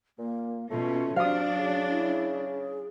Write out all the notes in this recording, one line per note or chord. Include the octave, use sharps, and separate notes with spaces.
A#2 A#3
B2 A3 C#4 F4
C3 F#3 D4 F#4 F5 D#6
C#3
E4
G#4